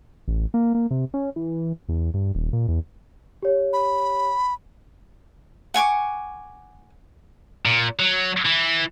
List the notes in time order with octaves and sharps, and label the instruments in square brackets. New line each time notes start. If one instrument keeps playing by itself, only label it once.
[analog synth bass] A1
A#3
A#3
C3
C#4
E3
E2
G2
D#1
A#2
E2
[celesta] G4 C#5
[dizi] B5
[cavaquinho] F#5 G#5 C#6 D6
[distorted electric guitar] A#2
F#3
E3